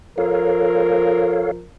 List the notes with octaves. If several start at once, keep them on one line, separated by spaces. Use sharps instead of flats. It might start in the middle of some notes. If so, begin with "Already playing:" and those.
F3 A4 A#4 C#5 F5